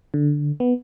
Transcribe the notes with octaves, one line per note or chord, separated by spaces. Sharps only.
D3
B3